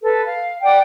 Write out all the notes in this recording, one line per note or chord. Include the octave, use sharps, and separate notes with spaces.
A4 B4
F5
D5 F#5 G5